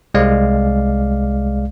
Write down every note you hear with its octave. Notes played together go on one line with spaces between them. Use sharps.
C2 G#3 D5 F5